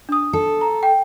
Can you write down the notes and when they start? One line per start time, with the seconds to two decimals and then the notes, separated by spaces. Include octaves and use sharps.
0.09 D4 D#6
0.33 A4
0.61 A#5
0.83 G5